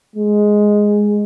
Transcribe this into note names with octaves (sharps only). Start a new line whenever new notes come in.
G#3